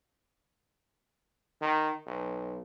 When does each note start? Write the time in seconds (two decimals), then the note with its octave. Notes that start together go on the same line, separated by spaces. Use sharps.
1.62 D#3
2.07 B1